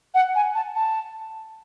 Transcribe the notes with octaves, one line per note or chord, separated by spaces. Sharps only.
F#5
G#5
A5
A5